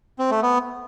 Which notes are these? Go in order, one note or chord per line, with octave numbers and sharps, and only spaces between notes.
C4
A3
B3